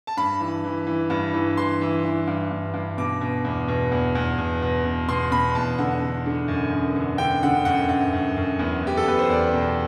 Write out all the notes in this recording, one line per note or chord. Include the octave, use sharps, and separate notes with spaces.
A5
G2 B5
E3
E3
E3
G2
E3
E3 C6
E3
E3
G2
G2
G2
B2 D6
B2
E2
B2
E2
E2
B2
B2
B2
B2 C6
B2 B5
E2 A5
D3 F#5
D3
D3
F#2
F#2
D3
D3 G5
D3 F#5
F#2 F#5
F#2 F#5
F#2
F#2
E2
E2 G4
A4
E2 B4
C5
E2 D5
B2